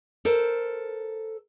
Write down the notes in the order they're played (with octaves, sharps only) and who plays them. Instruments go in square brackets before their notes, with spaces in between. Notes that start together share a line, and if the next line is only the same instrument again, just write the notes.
[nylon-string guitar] A4 A#4 C5